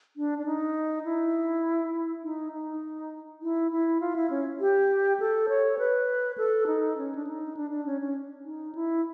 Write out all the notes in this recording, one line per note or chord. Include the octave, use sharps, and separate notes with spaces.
D4
D4
D#4
E4
D#4
D#4
E4
E4
F4
E4
C#4
G4
A4
C#5
B4
A4
D#4
C#4
D4
D#4
D4
D4
C#4
C#4
D#4
E4